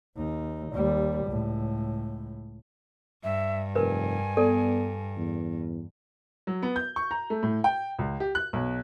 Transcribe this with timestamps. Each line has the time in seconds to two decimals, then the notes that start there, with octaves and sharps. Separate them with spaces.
0.16 D#2 D#4
0.73 D#2 G3
1.26 C#2 A2
3.23 G2 E5
3.75 F1 A#4 B4 G#5
4.37 B3 A4 D5
5.16 E2
6.47 F#3
6.62 B3
6.76 G6
6.96 C#6
7.11 A#5
7.30 A3
7.43 A2
7.64 G5
7.99 C#2
8.20 G4
8.35 F#6
8.53 B1